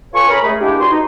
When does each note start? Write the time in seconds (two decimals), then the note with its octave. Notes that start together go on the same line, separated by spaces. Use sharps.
0.14 F4 A4 B4 C#5 G#5 C#6
0.29 C#4 G#4 A#4 A#5 B5
0.44 G#3 A3 G#4
0.60 G#3 A#3 D4 E4 G4
0.79 E2 E4 F#4 C6
0.91 D#4